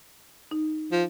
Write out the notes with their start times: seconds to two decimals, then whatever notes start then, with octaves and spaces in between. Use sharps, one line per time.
0.51 D#4
0.92 F3